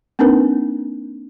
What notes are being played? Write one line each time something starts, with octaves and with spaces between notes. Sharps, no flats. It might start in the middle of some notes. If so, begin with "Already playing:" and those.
A#3 C4 D4 D#4 A#4 B4